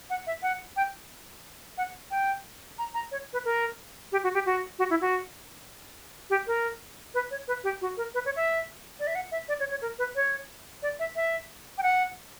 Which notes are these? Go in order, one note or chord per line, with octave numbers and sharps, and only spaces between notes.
F#5
E5
F#5
G5
F#5
G5
A#5
A#5
C#5
B4
A#4
G4
F#4
G4
F#4
F#4
E4
F#4
G4
A#4
B4
C#5
B4
G4
F#4
A#4
B4
C#5
E5
D5
E5
F#5
E5
D5
C#5
C#5
A#4
B4
C#5
D5
E5
E5
G5
F#5